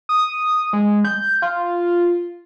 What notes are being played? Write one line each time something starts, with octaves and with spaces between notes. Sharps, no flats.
D#6
G#3
G6
F4